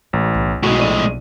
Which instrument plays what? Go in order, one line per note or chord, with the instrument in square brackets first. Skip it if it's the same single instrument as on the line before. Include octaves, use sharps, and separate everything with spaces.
[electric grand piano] A1 [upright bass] G#3
[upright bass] B1
[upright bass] B1 [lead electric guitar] A2 G#3 [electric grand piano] F#4
[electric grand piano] A#1 D5 D#7